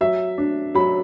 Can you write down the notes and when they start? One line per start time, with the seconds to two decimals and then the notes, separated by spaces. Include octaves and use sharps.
0.01 F#3 E5
0.38 D4
0.75 F#3 B5